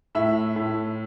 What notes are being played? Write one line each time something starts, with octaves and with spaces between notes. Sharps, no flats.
A2 E5
A2